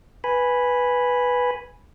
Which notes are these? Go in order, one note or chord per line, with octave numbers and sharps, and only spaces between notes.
B4 G#5 B5